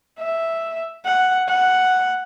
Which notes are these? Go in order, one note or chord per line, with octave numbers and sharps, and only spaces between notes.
E5
F#5
F#5